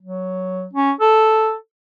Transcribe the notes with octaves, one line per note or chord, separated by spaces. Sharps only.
F#3
C#4
A4